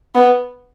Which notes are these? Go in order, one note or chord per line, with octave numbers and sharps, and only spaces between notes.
B3